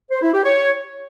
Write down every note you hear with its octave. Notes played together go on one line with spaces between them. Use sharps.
C5
E4
G4
C#5